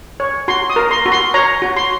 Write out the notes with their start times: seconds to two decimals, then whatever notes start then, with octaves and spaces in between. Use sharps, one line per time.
0.20 C#5
0.48 F#4 C6
0.70 D#6
0.76 A#4
0.91 C6
1.06 F#4
1.12 C6
1.34 C#5 A#5
1.62 F#4
1.77 C6